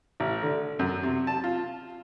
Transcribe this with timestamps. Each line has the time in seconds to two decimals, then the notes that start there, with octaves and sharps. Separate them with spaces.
0.20 A1
0.43 D3
0.79 F#2
1.03 C3
1.27 A5
1.44 F4